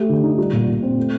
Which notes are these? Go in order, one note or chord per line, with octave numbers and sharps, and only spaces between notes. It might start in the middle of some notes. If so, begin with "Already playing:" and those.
Already playing: A3 G4
D3
D#4
G3
A#2
A#2
C4
A3